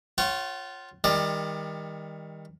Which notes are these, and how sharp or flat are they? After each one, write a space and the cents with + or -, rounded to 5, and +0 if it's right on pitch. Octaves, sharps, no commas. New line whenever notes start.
F4 +5 C#5 -15 F#5 +45
D#3 +20 G3 +30 D5 +35